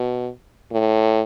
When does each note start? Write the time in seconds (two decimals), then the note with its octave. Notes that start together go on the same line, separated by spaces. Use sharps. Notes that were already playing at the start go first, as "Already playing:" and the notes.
Already playing: B2
0.72 A2